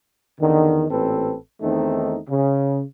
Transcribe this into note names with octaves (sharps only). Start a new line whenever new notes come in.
E2 D3 D#3
A1 A#2 C4 A4 B4
E2 D#3 A3 C4 D#4
C#3